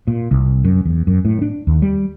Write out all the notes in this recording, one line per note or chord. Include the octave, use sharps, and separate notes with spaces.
A#2
C2
F#2
E2
F#2
A2
D4
D#2
G3